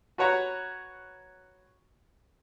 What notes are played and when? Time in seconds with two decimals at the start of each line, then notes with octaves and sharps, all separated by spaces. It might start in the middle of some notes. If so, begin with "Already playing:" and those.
0.18 F#4 B4 C#5 F#5 A#5